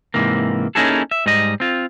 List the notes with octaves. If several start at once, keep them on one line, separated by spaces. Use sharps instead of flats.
G#2 C3 E3 A#3
A#3 C#4 D#4 E4 G#4 A4
E5
G#2 G3 D#5
C4 F4